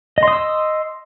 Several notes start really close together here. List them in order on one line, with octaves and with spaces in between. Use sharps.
D#5 C6 D#6 E6